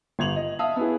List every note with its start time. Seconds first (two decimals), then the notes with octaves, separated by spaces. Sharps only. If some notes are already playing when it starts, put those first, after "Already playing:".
0.19 G1 G#6 F7 F#7
0.36 D#5
0.59 E5 F5 A5 D#6
0.76 B3 C#4 E4 G#4